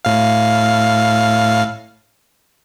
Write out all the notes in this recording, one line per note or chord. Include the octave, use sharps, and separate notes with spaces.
A2 F5